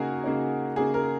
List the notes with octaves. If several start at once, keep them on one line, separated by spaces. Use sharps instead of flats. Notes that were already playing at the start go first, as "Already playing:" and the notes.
Already playing: C#3 A#3 D#4 F#4 G#4 A#4
C#3 A#3 D#4
C#3 A#3 D#4 G#4
A#4